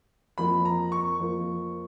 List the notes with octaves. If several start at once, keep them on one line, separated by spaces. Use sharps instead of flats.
F2 F3 A#3 B5
A#5
C#6
F2 F3 A#3